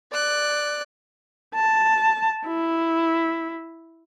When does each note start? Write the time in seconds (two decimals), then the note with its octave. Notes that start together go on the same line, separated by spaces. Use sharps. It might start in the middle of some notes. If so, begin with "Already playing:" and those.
0.12 D5 F#6
1.55 A5
2.47 E4